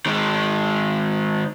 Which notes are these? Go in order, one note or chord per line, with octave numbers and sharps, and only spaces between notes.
D#3 G#3